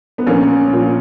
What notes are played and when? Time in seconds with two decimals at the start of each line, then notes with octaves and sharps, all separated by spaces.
0.18 B3
0.27 A#1 A#3 C#4
0.72 A#2 F3